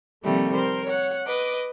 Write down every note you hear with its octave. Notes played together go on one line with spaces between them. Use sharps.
C3 D#3 F3 G3 A3 A#3
A#4 C5
C#5 F#5
B4 D#5 D6